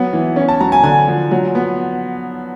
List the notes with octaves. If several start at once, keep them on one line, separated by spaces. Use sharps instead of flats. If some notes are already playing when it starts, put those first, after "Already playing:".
Already playing: F#3 B3
E3
C#4
A5
F#3 A#5
G#5
D3 G#5
F3
F#3
B3